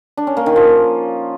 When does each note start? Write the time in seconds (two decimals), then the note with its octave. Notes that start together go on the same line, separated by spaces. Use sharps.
0.17 D4
0.27 C#4
0.37 A#3
0.46 D#3
0.56 F3